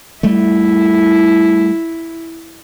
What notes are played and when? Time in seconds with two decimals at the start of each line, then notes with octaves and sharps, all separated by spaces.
0.23 G3 A3 E4